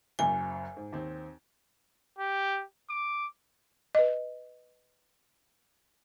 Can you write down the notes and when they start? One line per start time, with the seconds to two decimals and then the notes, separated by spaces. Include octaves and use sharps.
0.19 F#1 F#2 G#5
0.77 G#2
0.93 D#2 C4
2.19 G4
2.90 D6
3.95 B4 D#5